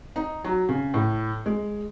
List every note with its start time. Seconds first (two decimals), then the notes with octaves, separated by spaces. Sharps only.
0.16 D#4
0.44 F#3
0.69 C#3
0.94 A2
1.46 G#3